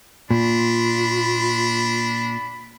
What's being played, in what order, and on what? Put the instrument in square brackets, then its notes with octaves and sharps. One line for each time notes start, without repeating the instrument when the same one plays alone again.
[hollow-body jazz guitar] A#2 [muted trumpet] D4 [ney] F4 [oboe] B5